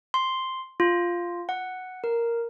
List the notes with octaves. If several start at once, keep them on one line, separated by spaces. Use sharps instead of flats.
C6
F4
F#5
A#4